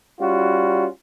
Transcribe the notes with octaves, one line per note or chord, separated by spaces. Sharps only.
G3 C#4 F4 F#4